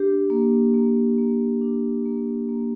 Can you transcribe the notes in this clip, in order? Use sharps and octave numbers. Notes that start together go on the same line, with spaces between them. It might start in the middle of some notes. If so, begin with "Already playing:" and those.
Already playing: D4 G4
A#3
A#3
A#3
D4
A#3
A#3